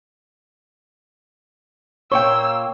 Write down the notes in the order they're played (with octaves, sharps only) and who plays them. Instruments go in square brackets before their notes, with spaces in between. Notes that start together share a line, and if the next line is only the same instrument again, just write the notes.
[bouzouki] A#2 A#3 G5 [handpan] C#5 [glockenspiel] C#6 [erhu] E6